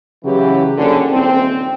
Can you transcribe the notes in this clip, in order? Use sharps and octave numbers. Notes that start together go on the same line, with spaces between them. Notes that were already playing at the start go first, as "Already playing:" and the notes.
C#3 E3 F#3 G4
F#1 D3 G3 C#4
D#1 C4